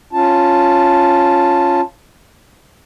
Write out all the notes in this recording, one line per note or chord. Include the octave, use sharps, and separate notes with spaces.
C#4 F4 A5